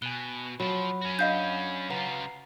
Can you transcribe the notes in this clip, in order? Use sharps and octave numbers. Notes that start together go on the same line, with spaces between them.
B2 G#5 F#6 G7
F3 F#3 C5 B5
C#4 F#4
D4 D#5 F5 F#5 B5 G6
C#3 F4 B4 F#5 A#5